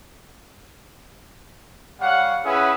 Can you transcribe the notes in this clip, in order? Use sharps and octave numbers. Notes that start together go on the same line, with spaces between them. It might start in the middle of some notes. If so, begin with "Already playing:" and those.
G3 C#5 F5 F#5
C#4 E4 G#4 B4 E5 F#5